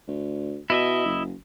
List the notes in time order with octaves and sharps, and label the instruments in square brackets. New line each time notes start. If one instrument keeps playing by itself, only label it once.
[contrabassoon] D2
[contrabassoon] B2 [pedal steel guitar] E4 D#5 E5
[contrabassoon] F#1